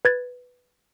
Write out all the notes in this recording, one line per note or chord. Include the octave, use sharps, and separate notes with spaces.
B4 G#6 A6